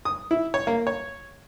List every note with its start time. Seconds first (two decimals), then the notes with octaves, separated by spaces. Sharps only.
0.05 D#6
0.31 E4
0.54 C#5
0.67 A#3
0.87 C#5